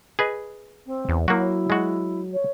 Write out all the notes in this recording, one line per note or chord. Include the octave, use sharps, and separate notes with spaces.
G#4 B4 D#5
C4
E2
F#3 A#3 E4 F#4
G#3 F#4
C#5